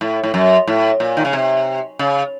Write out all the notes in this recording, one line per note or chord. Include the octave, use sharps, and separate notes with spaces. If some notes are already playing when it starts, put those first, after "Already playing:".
A2
A2
F#2
A2
A#2
D#3
C#3
C3
C#3